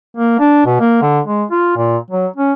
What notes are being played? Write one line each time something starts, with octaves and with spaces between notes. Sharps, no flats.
A#3
D4
B2
A#3
D3
G#3
F4
A#2
F#3
C#4